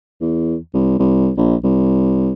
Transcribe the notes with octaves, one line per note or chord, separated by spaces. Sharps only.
E2
C2
C2
A#1
C2